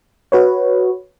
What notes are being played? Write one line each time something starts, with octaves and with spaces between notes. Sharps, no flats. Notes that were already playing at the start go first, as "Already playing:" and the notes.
F#4 B4 C#5